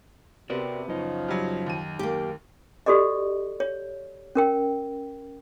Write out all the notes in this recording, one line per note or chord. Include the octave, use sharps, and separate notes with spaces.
C3 B3 F#4 A#4 D5
F#2 C#3 F3 D#4
F#3 G3
D#2 D#7
A#3 G4
F#4 G4 A4 D5 D#5
C#5
C#4 A#4 G5